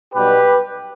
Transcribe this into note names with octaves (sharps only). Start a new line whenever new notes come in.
B1 B2 G3 G4 B4